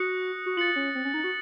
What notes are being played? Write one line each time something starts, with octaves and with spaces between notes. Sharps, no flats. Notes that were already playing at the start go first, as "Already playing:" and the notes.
Already playing: F#4 D#6 F#6 A#6 C#7
F#4
F4 A6 C#7 F#7
C#4
C4
C#4
D#4
F#4